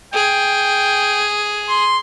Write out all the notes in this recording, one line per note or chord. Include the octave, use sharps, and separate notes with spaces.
G#4 G5
C6